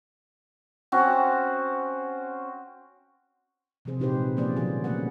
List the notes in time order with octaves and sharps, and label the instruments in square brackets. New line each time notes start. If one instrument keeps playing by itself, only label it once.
[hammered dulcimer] C4 C#4 F#4
[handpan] C3 E3 F3 C4 G#4 C5
A#2 D#4 G4 B4 C5
G#3
F3 A#3 C#4 G#4 C5 D5
B2 D#3 F#3 B3 F#4 G#4
A3 A#3 C#4 B4 F#5